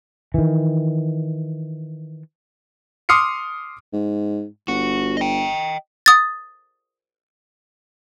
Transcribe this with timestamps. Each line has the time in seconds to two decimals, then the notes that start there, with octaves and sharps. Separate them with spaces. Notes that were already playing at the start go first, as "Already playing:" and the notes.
0.34 D#3 E3
3.09 C6 D6 D#6 F6 C7 C#7
3.93 G#2
4.68 G1 F#4
5.17 D#5 G5
6.06 D#6 A6